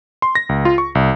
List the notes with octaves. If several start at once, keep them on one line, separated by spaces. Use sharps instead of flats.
C6
A#6
C#2
F4
C#6
C2